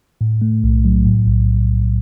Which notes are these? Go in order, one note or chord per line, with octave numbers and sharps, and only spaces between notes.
A2
A3
B1
F#3
A2
B1